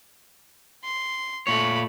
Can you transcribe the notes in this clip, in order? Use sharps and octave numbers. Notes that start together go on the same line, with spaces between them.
C6
A#2 A3 C#5 B5